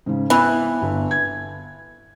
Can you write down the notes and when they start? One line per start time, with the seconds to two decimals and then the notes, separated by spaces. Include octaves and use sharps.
0.06 G#2 C#3
0.30 E3 B3 B5
0.82 G1
1.11 G#6